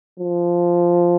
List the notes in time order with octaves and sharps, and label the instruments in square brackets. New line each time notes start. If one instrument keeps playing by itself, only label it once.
[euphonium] F3